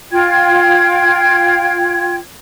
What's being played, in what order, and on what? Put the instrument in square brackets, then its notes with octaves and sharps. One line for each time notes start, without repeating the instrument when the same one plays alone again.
[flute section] F4 G5 G#6